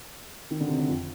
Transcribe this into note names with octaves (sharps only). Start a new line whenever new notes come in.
D#3
D3
C3
D3
F2